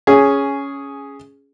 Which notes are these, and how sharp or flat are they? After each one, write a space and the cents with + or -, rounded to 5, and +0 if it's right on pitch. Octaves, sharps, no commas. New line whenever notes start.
C#4 +5 G#4 +0